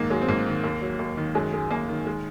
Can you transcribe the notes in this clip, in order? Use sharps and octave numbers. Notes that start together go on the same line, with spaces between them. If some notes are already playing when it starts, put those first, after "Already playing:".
Already playing: G#2 D#3 A#3
F#3 G#3
C4
G#2 A#3
D#3
D#2
F#3
D#2
D#3
F#2 G#3
G#3
F#2 A#3
D#3
G#3